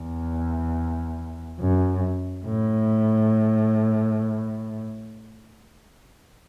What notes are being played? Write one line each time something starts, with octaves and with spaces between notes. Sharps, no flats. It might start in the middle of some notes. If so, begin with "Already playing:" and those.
Already playing: E2
F#2
A2